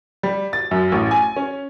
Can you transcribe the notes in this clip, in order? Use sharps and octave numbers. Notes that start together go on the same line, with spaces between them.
G3
A6
F#2
A1
G#5
C#4